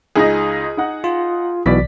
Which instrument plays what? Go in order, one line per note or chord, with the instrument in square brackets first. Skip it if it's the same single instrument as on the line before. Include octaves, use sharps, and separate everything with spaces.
[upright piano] C#2 D#4 D#5 [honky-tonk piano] G#4
[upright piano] D#4 F#5
[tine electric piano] F4
[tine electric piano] B1 B2 E3 [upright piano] D5 B6